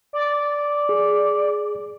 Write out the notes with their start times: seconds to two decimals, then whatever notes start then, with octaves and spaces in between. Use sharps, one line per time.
0.13 D5
0.89 G#4